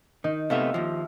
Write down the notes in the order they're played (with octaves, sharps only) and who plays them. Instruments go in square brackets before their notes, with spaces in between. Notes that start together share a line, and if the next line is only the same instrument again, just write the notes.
[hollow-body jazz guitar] D#3 [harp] D#4
[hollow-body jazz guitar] C3 A3 B3 [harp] E5 F5
[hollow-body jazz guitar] D#2 F3